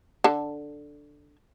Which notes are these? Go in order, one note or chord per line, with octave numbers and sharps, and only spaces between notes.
D3 A4